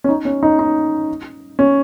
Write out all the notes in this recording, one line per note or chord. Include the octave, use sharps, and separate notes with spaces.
C#4
D#4
C#4
D#4
D#4
C#4